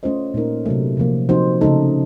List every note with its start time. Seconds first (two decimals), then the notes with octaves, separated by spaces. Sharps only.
0.03 A3 C#4 F4 C5 D#5
0.34 A#2 A3 D#4 A#4
0.66 C3 F#3 A3
0.97 C3 F3 A#3
1.29 F3 C4 D#4 F#4 C5
1.61 C#3 A3 D#4 A4